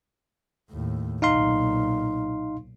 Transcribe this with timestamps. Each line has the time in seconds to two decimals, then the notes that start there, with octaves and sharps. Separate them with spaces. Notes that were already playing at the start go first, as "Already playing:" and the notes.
0.70 D#2 A2
1.22 B1 A#2 D#4 F5 C6